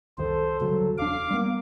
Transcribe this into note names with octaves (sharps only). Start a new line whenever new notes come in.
C2 F2 D#3 A4 C5
D2 G2 C#3 F#3
E1 D4 F5 D6 C7
G3 A#3 B3